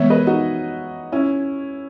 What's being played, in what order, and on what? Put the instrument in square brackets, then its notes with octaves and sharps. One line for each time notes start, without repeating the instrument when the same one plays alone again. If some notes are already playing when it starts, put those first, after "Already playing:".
Already playing: [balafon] E3 G#3 B3 [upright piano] C#5 E5
[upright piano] B4 D#5
D#4 F#4
C#4 E4